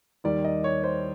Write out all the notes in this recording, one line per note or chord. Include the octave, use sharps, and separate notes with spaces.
D#2 D#3 G3 D5
D#5
C#5
C5